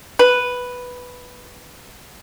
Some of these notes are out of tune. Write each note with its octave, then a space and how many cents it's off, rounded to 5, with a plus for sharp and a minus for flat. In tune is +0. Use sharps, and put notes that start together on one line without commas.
B4 +0